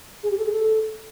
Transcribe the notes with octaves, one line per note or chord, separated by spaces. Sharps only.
G#4
G4
A4
G#4
A4